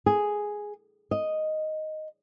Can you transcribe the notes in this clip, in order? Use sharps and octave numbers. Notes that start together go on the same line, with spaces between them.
G#4
D#5